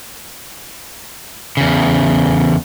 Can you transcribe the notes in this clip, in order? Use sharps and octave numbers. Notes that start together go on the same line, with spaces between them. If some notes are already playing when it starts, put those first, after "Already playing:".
E2 C#3